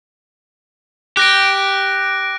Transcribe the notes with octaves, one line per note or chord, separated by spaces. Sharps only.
G4 F#6 A#6 D7